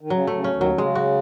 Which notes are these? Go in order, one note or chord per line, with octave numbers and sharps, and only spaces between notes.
D#3
C#3 F#3
A3
C#3
C#4
D#2 D#3
F#3
D#3
C#3 G#3
F#4